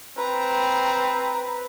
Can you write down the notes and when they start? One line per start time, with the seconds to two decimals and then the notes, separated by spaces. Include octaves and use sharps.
0.17 C4 B4 A#5